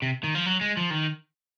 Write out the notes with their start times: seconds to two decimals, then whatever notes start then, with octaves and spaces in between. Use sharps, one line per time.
0.02 C3
0.24 D#3
0.35 F3
0.46 F#3
0.61 G#3
0.77 F3
0.91 D#3